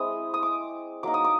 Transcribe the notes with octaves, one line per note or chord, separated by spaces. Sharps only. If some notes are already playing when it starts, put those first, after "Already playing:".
Already playing: G#3 C4 E4 D#6
D#6
D6
F#3 A#3 D#4 D6
D#6
D6